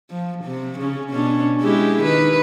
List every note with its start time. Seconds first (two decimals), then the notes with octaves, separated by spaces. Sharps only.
0.10 F3
0.44 C3
0.79 C#3 C#4
1.10 B2 C#4 D4
1.61 G#3 E4 G4
2.02 D#3 B4